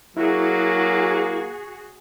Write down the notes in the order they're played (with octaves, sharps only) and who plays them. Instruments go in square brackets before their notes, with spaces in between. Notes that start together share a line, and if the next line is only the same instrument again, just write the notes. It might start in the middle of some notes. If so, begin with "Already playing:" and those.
[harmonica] F#3 A#3 [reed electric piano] E4 [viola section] F#4 G#4